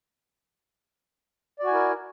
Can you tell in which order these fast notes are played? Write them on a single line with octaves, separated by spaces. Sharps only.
D5 F#4 G#5 E4 A#4